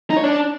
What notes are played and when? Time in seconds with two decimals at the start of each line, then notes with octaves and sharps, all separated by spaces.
0.10 D#4
0.17 C#5
0.23 D4